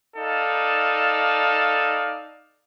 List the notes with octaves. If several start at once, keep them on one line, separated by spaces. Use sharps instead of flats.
D#4 A4 D5 F5